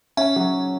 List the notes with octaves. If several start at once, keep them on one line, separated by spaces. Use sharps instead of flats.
C#4 E5
F#3